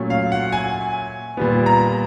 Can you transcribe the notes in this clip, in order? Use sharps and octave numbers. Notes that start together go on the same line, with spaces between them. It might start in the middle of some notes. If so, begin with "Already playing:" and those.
Already playing: A#2 F#3 A3 C#4
F5
F#5
G#5
A#2 G3 B3
A#5